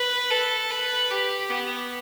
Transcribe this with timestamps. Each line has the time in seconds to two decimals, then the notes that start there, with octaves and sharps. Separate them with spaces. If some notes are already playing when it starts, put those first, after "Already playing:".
Already playing: B4
0.30 A4
0.70 B4
1.10 G4
1.49 B3